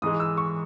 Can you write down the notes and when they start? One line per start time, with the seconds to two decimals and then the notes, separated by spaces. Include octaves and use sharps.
0.02 G#2 E3 G#3 D#6
0.20 E6
0.37 C#6